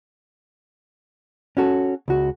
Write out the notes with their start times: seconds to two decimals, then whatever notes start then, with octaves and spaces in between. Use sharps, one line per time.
1.57 C#4 F#4 A4
2.08 C#2 F#4